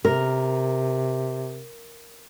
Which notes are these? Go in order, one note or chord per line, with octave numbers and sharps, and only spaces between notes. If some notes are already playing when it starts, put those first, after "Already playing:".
C3 A#4